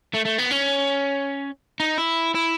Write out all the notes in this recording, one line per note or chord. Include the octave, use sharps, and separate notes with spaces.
A3
A3
B3
C#4
D#4
E4
E4